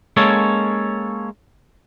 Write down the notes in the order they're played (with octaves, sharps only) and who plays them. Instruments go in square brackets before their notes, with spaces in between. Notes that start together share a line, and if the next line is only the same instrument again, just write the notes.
[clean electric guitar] G#3 A#3 C#4 A4 C#5